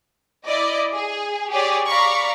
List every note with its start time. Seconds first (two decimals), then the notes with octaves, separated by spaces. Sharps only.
0.47 E4 D5 D#5
0.94 G#4
1.51 G4 G#4 C#5 D5
1.89 D5 F5 A#5 B5 C#6